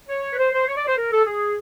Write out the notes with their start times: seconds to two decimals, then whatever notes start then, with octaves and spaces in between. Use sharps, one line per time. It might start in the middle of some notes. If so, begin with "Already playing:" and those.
0.09 C#5
0.33 B4
0.39 C5
0.53 C5
0.67 C#5
0.77 D5
0.87 C5
0.97 A#4
1.11 A4
1.26 G#4